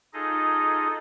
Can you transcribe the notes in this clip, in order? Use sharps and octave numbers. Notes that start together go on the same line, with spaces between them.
D#4 F4 G#4 A4 D#5